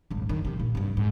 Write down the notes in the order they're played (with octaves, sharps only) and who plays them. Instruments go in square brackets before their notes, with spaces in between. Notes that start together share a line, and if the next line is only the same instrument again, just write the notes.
[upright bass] D#1 G#1
F#2 D#3
C3 F3
A#2
G2 C3
G#2